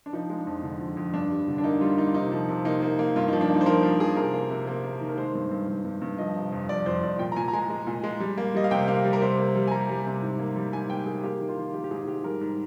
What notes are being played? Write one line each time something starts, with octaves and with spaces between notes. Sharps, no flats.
D4
F3 D#4
G#3
D4
F2
D3
F2
F2
G2 D4
G3
D3
D4
A#3 D#4
G3 F4
A#3 D#4
C3 D#4
F3
C3
A#3 D#4
A#3
A#3
G2 F4
D#4
F3
D4
A#3 D#4
C5
F3 A#4
F3 C5
F3 G#4
C3 A#4
A#3
C3
A#3
A#3
D#3
A#4
G#3 C5
G2
G2
G2
G2
G2
F3 D#5
C3
F2
F2 D5
F2 C5
F2 D5
A#2 G5
A#5
A#2 G#5
A#5
G#3 G#5
G#3
A#2
G#3
G3
A#3
G3 D#5
F5
C3 G5
A#3 F5
G3
A#4
C3 C5
A#3
G3
G#5
G3 A#5
G3
C3
G#2
A#3
G3
G#2 G#5
A#3 G5
A#3 G#4
A#3 G4
D#3
F4
D#3
A#3 G4
G4
G#2 G#4
G#2 G4
G3 A#4
G#2